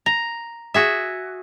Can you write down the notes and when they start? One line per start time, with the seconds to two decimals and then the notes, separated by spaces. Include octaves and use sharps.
0.06 A#5
0.74 F#4 G#4 E5